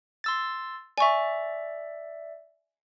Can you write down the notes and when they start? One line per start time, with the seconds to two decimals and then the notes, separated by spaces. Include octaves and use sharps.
0.24 C6 E6 A6
0.98 D5 E5 G#5 C#6